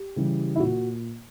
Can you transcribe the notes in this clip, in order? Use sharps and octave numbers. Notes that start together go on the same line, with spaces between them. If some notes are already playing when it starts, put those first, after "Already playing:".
Already playing: G4
C#3 E3 G3
E4
A#2 F#4